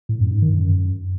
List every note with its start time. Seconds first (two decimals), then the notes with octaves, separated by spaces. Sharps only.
0.09 A2
0.20 F#2
0.31 G#2
0.42 D#3
0.53 F#2